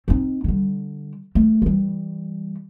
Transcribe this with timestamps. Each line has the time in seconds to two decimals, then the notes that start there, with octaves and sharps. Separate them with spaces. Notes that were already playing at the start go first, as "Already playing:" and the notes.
0.08 C4 D#4
0.44 D3 G3
1.35 A3
1.62 E3 G3